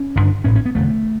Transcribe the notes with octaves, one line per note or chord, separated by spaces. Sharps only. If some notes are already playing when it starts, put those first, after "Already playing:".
Already playing: C#4
A1 G2 D3
A1 A2 C#4
C#4
B3
E1 E2 D3 A3